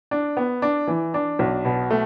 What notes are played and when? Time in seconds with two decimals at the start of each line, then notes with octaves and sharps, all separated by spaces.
0.11 D4
0.37 B3
0.62 D4
0.87 E3
1.14 D4
1.39 B1
1.65 B2
1.91 A3